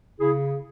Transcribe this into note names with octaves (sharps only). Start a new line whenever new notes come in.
C#3 E4 G#4